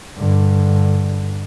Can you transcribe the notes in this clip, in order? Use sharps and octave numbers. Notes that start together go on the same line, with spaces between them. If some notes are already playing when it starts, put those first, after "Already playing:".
G2 D3